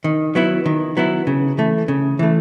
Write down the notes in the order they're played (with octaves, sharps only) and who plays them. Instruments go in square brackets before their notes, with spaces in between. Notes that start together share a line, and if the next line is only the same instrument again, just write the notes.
[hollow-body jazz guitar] D#3
F#3 B3 E4
D#3
F#3 B3 E4
C#3
E3 A3
C#3
E3 A3